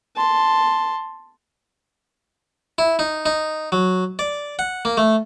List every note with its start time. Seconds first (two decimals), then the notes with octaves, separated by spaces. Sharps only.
0.16 A5 C6
2.78 E4
2.99 D#4
3.26 D#4
3.72 F#3
4.19 D5
4.59 F#5
4.85 A#3
4.97 A3